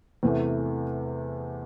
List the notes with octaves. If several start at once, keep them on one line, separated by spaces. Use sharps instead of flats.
E2 C3 E3 A3